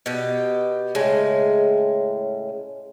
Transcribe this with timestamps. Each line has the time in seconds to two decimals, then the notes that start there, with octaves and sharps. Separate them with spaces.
0.06 B2 G4
0.95 A2 C#3 G#3